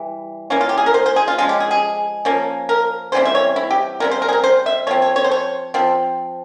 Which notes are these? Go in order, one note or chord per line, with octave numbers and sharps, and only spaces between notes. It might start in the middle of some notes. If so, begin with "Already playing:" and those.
Already playing: E3 G3
E3 A#3 C#4
F4
G4
G#4
A#4
C5
C5
G#4
F4
F3 G#3 C#4 F4
G4
G#4
G#4
F3 A#3 C#4
A#4
C#3 E3 G3 C4 C5
E5
C#5
E4
G4
C#3 G3 C4 A#4
C5
A#4
G#4
A#4
C5
E5
F3 C4 C#5
C#5
C#5
C5
C#5
F3 C4